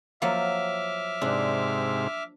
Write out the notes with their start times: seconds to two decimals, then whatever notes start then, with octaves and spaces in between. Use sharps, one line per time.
0.22 F3 F#3 A#3 E5 D6 F6
1.22 G#2 C3 D4